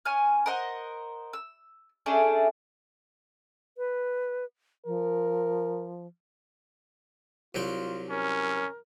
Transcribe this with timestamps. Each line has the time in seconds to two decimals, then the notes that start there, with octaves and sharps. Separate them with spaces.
0.05 C#4 G#5 F6
0.46 A#4 C5 D#5 F#5
1.33 E6
2.06 A3 C#4 D4 G#4
3.78 B4
4.86 F3 A#4
7.55 C2 F#3 F4 G5
8.10 C#4 A#4